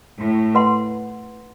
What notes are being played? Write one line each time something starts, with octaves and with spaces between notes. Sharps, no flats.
A2
B4 F#5 C6